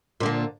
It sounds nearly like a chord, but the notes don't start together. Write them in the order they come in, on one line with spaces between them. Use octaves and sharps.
A#2 D3 A#3